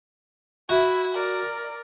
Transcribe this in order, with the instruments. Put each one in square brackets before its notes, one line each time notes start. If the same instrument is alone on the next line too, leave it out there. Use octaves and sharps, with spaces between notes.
[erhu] E4 [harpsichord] F#4 [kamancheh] E5
[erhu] A#4 [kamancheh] D5